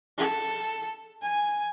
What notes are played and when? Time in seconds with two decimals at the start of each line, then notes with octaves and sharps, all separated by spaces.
0.18 A4
1.22 G#5